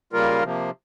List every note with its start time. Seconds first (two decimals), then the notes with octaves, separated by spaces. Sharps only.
0.13 C#3 G3 A#3 F4 A#4
0.43 C3 F3 A#3